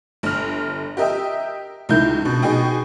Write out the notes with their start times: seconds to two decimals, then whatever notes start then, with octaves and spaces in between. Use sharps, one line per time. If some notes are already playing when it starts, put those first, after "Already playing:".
0.23 G1 F6
0.97 G4 A#4 D#5 E5 G5
1.89 C#2 D#3 E4 A#4 G6
2.22 G2 B2
2.42 B2 D#4 G#4 G5